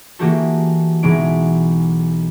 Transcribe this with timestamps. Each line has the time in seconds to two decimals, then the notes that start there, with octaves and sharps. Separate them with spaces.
0.19 E3 G#3 A#3 F#4 G4 A4
1.03 B1 B2 E3 G#3 D7